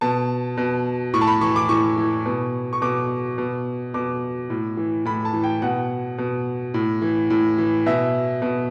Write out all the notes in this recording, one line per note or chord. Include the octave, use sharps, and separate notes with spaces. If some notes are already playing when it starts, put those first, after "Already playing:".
B2 A5
B2
A2 C#6
A5
B5
E3 C#6
D6
A2 C#6
E3
B2
C#6
B2 D6
B2
B2 D6
A2
E3
A2 B5
A5
E3
G5
B2 F#5
B2
A2
E3
A2
E3
B2 E5
B2